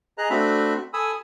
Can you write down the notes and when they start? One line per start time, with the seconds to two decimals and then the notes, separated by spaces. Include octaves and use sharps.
0.18 G#4 D#5 A#5 F#6
0.30 A3 C4 D4 F#4 E5 B5
0.93 A4 G#5 B5 D#6 E6